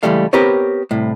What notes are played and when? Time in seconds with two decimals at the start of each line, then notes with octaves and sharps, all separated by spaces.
0.03 C#2 G#2 E3 G3 A3 F5
0.33 B3 C4 G4 A#4 B4 C#5
0.91 C2 A2